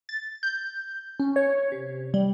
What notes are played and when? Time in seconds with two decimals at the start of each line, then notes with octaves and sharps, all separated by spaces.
0.09 A6
0.43 G6
1.20 C#4
1.36 C#5
1.72 C3
2.14 G3